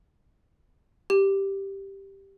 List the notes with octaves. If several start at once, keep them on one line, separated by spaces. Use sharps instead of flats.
G4